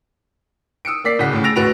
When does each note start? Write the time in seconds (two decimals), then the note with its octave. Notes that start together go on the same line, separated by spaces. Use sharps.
0.85 D#6 E6 C#7 D7
1.04 A#3 D5 B6 C7
1.19 D1 C#3 F#5 B6
1.33 A2 C#3
1.44 E6 A6 A#6 D7 F7
1.56 A1 D2 F#4 B4 D7 F7